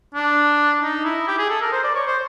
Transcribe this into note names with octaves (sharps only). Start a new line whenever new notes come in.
D4
D#4
E4
G4
G#4
A4
A#4
C5
D5
C#5
C5